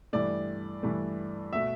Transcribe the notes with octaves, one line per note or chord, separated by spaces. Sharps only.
G2 E3 A3 D5
G2 E3 A3
B2 A3 E5